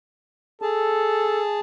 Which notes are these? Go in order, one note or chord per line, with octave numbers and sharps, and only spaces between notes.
G#4 A4 A5